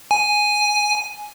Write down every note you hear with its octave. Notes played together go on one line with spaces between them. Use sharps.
G#5